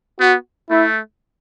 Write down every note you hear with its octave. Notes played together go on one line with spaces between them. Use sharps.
B3 F#4
A3 E4